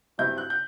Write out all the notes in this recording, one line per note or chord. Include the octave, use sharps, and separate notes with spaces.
G2 F#3 C4 E4 G6
F#6
G6